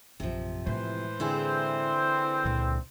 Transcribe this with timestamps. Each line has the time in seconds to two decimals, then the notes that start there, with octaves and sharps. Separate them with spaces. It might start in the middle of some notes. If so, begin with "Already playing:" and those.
0.20 A#1 F#2 C3 F3
0.67 A2 E3 G#3 C5
1.20 D3 C4 E4 G#4
2.45 C#2 A#2